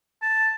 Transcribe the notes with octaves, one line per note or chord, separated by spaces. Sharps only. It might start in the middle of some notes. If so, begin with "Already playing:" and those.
A5